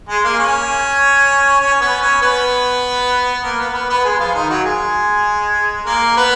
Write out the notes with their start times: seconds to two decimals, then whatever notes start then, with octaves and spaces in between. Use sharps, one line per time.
0.09 G#3 G#4
0.24 A#3 A#4
0.39 C#4 C#5
1.61 C#4 C#5
1.81 B3 B4
2.02 C#4 C#5
2.22 B3 B4
3.43 A#3 A#4
3.58 B3 B4
3.73 B3 B4
3.89 B3 B4
4.04 G#3 G#4
4.19 F3 F4
4.34 D#3 D#4
4.49 F#3 F#4
4.64 G#3 G#4
5.86 A#3 A#4
6.17 B3 B4